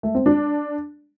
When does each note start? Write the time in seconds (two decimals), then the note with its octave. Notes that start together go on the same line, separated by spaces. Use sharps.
0.03 A3
0.15 C4
0.26 D4